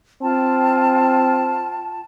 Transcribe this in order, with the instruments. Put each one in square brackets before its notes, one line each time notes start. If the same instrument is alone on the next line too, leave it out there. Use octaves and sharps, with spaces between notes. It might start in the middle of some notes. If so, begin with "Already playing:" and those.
[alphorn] C4 [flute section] F4 G5 A5